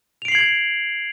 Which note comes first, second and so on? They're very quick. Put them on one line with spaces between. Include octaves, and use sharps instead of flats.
F7 D7 C7 F#7 G#6